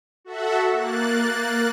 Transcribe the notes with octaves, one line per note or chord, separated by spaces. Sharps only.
F#4 A4 E5 F#5
A#3 F#6 A6